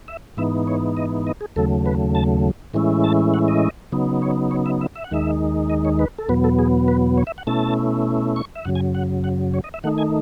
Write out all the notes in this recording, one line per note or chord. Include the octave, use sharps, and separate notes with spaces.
E5
G#2 E3 B3 D#4 E5
C#5
D#5
D#5
G#4
D#2 C#3 F#3 A3 A4
B4
A5
A2 E3 G#3 C#4 E4
A5
F#5
D#5
C#3 F#3 B3 D#4
C#5
C#5
E5
E5
E5
F#5
D#2 D#3 G#3 D#4 E5
D#5
C#5
B4
A4
E2 B2 F#3 B3 B4
A4
G#4
B4
C#5
E5
F#5
B2 A3 C#4 E4 A5
C#6
E5
F#2 C#3 F#3 F#5
G#5
F#5
F#5
C#5
D#5
E5
D#3 A3 D#4 F#5
G#5